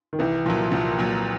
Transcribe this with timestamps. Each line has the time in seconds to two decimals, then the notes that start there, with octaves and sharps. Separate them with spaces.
0.13 D#3
0.19 C2 E3
0.46 A#2 F3 F#3
0.72 C2 F3
0.98 A#2 F#3